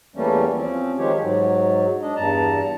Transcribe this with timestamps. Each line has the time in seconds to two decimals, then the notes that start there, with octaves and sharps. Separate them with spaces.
0.16 E2 E3 G3 A3 A#3 C#4
0.56 F3 C4 C#4
0.98 D#3 F3 G#3 G4 C#5
1.21 G#2 F#3
2.02 D4 D#5
2.16 E2 G2 A5 A#5